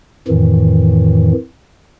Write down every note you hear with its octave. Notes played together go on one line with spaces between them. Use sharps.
F2 A2 D#3 E3